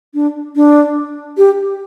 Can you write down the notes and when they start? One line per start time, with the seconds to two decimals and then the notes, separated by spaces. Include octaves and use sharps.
0.14 D4
0.56 D4
1.38 G4